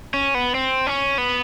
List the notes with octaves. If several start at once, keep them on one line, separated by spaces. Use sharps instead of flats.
C#4
B3
C4
C#4
B3